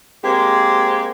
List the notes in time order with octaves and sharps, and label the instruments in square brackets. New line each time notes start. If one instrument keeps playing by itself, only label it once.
[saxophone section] G#3 A#3 C4 G4